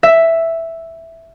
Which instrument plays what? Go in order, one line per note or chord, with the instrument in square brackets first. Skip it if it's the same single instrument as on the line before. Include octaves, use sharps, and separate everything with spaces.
[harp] E5